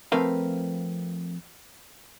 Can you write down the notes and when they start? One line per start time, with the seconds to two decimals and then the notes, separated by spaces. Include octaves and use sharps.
0.12 F3 A3 C4 A#4 B4 F5